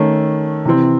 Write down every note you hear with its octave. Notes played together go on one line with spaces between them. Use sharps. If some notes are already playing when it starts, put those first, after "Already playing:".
Already playing: D#3 A3 C#4
C3 E3 C4